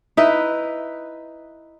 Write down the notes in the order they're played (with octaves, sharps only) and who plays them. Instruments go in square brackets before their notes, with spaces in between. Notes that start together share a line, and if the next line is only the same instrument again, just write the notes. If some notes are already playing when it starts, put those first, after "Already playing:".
[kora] D#4 E4 B4